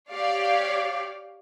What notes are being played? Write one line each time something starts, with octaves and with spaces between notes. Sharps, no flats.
G4 C#5 D5 F5